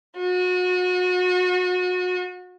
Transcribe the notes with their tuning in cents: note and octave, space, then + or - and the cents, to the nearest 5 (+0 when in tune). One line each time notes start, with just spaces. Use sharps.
F#4 -30